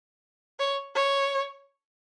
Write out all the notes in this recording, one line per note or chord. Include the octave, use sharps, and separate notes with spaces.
C#5
C#5